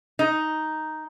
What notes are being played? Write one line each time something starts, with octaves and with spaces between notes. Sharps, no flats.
D#4